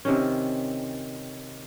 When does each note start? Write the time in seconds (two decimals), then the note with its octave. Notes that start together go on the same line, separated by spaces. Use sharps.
0.05 C3 D#3 C#4